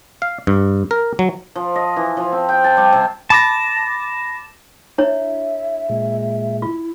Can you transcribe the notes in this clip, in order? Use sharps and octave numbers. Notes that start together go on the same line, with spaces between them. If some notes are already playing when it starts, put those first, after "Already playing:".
F5
G2
A#4
F#3
F3
D#5
E3
F3
C4
G5
A5
G3
C3
A5 B5 D6 A#6
D4 E4 C#5 E5
A#2 G#3
E4 F4